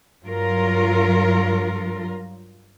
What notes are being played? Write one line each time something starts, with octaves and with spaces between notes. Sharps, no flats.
G2 F#3 F4 A#4